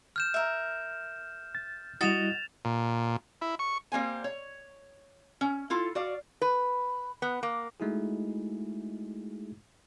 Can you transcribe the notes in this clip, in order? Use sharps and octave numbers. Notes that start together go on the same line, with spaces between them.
F6 G6 E7
A#4 E5
A6
G3 E4 F#4 D#5 A6 E7 F7
A#2
E4
C#6
G3 A#3 C4 G#5
C#5
C#4
E4 F4 A4
F#4 D5 F5
B4
B3
A#3
G#3 A3 D#4 E4 F#4 G#4